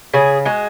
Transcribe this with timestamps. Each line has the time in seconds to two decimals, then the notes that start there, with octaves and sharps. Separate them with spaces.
0.14 C#3 G#4
0.46 G#3 F#4